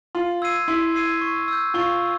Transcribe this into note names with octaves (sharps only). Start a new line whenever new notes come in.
F4 C6
E6 G#6 C7 D#7
E4 C6
E6 G#6 C7 D#7
C#6
E6 G6
F4 C#6
E6